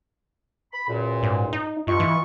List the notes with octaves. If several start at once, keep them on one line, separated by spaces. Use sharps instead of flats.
B5
C#2 F#2 A#2
G#2
D#4
G2 F4 D#5 C#6
E3